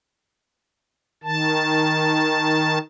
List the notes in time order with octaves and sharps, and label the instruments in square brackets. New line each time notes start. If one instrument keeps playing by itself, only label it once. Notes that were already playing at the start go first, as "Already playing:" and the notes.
[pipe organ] D#3 A5